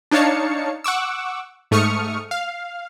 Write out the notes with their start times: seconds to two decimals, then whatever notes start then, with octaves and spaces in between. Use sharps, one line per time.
0.11 D4 D#4 C#5 F5 A5 C#7
0.84 F#5 C#6 D6 E6
1.71 G#2 A3 C#6 D#6 F6 C#7
2.31 F5